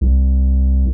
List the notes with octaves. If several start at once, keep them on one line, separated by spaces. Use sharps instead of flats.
C2